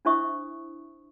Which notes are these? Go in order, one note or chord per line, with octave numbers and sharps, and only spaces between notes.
D4 E4 C5 E5 C#6 D#6